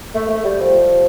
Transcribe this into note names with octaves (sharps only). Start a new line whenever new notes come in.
A3
A3
G3
F3